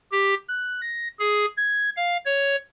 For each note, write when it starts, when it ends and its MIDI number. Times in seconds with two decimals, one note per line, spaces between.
0.12 0.34 67
0.48 0.81 90
0.81 1.08 94
1.19 1.45 68
1.57 1.90 92
1.97 2.17 77
2.25 2.56 73